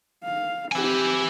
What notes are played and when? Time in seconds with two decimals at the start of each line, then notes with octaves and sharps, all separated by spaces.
0.25 F5
0.72 C4 E4 G4 G#5